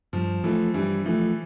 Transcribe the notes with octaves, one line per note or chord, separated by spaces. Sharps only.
G2 F3
E3 F3 A3
G2 E3
E3 F3 A3